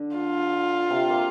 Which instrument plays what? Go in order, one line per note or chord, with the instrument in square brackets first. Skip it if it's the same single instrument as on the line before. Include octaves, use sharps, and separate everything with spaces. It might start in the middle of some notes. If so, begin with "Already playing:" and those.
Already playing: [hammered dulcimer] D3
[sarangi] F4
[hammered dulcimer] C3
A#3